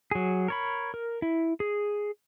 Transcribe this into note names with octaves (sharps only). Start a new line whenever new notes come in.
F#3 G#4
A#4 C#5 B5
A#4
E4
G#4